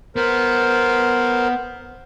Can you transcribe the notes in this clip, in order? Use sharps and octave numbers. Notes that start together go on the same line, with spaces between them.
B3 A#4 C5